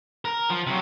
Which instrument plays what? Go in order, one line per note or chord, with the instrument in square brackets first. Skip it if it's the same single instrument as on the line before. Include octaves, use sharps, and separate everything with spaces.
[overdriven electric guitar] A#4
F3
C3 F#3